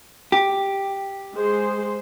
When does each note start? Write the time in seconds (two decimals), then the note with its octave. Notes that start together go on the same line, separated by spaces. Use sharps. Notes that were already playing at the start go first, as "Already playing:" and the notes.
0.32 G4
1.35 G#3 G#4 C5